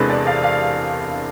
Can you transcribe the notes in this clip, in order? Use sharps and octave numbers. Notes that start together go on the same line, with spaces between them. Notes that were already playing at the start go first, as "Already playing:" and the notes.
Already playing: E1 E2 C3 G#3 D4 A4 B4
D5
F5
F5